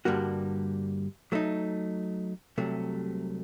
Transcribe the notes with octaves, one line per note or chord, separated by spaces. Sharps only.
G2 D3 G3 A#3 F#4
F#3 A3 D#4
C2 C3 F#3 A3